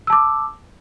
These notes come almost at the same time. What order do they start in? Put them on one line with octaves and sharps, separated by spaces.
E6 A5 D6